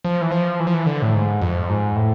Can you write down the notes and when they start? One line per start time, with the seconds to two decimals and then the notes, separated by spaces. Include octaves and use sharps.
0.05 F3
0.21 E3
0.32 F3
0.60 E3
0.67 F3
0.74 E3
0.86 D3
1.02 A2
1.14 G#2
1.42 F2
1.70 G#2
1.96 A2